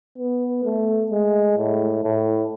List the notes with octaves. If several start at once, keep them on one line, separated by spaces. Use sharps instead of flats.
B3
A3
G#3
A2
A2